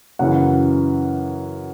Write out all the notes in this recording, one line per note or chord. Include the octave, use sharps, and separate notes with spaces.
F#2 C#3 E3 F#5